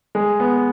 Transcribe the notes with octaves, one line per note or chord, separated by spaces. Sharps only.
G#3
B3